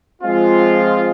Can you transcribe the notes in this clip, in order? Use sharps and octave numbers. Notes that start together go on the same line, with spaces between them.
F3 G#3 C4 F4